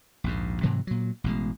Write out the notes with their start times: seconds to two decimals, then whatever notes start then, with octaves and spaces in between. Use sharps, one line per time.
0.24 A#1 D#2 G#2
0.63 G#2 C3 E3 F#3
0.87 A#2 F#3
1.24 A1 B2 G#3